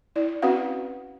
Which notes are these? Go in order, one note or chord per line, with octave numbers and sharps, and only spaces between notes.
E4 D5
C4 C#4 F#4 B4 F5 F#5